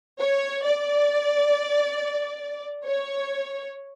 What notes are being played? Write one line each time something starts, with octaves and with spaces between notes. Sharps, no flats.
C#5
D5
C#5